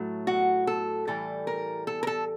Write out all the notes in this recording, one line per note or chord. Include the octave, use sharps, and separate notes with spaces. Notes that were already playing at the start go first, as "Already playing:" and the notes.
Already playing: A2 F#3 A3
F#4
A4
A2 E3 G3 A4
A#4
A4
A#4
A4